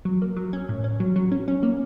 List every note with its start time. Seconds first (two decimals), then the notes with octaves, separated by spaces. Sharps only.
0.05 F#3
0.22 A#3
0.36 F#3
0.53 C#4
0.69 A2
0.84 C#4
1.00 F#3
1.16 F#3
1.32 C#4
1.48 C#4
1.63 A#3